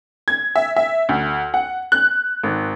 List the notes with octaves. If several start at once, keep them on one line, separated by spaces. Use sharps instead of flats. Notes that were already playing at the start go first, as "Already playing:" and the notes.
G#6
E5
E5
D2
F#5
F#6
G#1